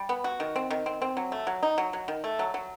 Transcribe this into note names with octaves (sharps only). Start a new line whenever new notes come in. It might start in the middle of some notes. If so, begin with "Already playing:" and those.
Already playing: G3
B3
F#4
D#3
C4
D#3
C4
C4
F#3
A3
F#3
D#4
F#3
F#3
D#3
A3
F#3
F#3